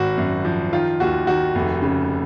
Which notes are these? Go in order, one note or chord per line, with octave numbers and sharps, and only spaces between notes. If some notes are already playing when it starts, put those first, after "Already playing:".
Already playing: G#1 F#4
F#2
F3
D#3 F4
D#2 F#4
D#3 F#4
F1
C#3